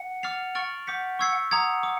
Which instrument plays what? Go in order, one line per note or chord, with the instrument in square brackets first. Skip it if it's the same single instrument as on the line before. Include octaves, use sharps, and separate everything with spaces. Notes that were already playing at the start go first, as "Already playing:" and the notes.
Already playing: [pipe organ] F#5
[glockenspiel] D6 F6 A6 C7 F7
C#6 F6 A6 D7 F#7
[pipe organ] F#5 [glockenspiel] D6 G6 B6
[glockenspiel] C#6 E6 G#6 C7
[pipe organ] F#5 [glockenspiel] A#5 D#6 G#6
[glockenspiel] D6